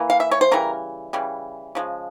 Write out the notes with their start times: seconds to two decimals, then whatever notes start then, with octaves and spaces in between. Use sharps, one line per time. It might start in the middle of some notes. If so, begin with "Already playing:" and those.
Already playing: E3 A#3
0.10 F5
0.20 E5
0.31 C#5
0.41 C5
0.51 C#3 E3 G3 A#4
1.13 C#3 E3 G3
1.75 C#3 F3 G#3